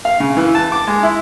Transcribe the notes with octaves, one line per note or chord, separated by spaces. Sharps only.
F5
C#3
E3
A5
D6
G#3
E4